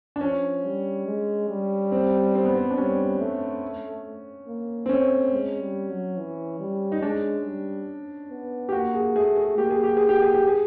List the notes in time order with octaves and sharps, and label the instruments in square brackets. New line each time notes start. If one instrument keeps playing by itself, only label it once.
[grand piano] D4
[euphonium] F3 [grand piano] C#4
[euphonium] G3
G#3
G3
[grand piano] C4
C4
B3
C4
D4
[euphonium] G3 [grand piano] C#4
[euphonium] A3
A#3
[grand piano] C4
[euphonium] A3 [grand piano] C#4
[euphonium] G#3
G3
F#3
E3
G3
[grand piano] D#4
[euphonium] G#3 [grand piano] D4
[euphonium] G3
B3
[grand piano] G4
[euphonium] A#3 [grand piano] F#4
[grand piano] G#4
[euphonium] A3 [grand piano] G#4
[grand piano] G#4
[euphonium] A#3 [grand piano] G4
[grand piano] G#4
G4
[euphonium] A#3 [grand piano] G#4
[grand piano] G4
G#4
G4
G#4